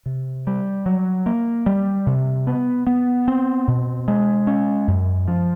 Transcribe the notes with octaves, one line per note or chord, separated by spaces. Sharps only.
C3
G3
F#3
A#3
G3
C3
B3
B3
C4
B2
G#3
C#4
F#2
F3